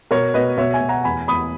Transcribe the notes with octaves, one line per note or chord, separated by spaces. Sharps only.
B2 A#4 C#5
B2 B4 D#5
B2 C#5 E5
E5 G#5
B2
F#5 A#5
E2 G#5 B5
E2 B5 D#6